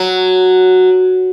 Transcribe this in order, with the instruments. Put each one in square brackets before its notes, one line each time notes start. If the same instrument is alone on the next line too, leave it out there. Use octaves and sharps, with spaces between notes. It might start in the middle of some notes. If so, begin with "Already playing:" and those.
Already playing: [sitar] F#3